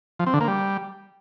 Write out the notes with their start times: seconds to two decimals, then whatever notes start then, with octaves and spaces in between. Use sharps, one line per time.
0.19 F3
0.27 C4
0.34 D3
0.41 A#3
0.48 G3